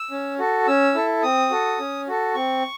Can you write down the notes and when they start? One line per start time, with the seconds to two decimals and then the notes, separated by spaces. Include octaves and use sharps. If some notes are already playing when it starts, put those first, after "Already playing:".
Already playing: E6
0.11 C#4
0.39 F#4 A4
0.67 C#4 E6
0.95 E4 A4
1.23 C4 D#6
1.51 F#4 A4
1.80 C#4
2.07 F#4 A4
2.35 C4 C#6